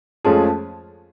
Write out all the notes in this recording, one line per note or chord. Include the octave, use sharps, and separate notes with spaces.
F2 F3 G#3 A3 C#4 G#4